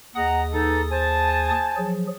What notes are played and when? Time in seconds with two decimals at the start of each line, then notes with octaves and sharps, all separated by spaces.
0.16 D#2 G#4 D#5 F#5 A#5 D#6
0.53 E3 D#4 A4
0.91 C5 G#5 A5
1.76 F3 F#3 G#4